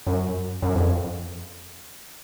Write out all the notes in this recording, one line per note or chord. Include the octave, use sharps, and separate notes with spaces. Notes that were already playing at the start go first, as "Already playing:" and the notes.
F#2
F#2
F2